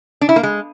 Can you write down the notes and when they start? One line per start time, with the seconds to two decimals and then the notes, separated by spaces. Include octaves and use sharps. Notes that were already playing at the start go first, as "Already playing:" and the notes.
0.21 D4
0.29 E4
0.36 A#3
0.43 G#3